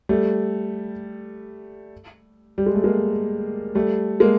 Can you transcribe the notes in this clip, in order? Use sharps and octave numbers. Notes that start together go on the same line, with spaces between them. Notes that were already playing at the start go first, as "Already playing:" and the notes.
G3 A3
G3
G#3
A3
G#3 A#3
G3 A3
G#3 A#3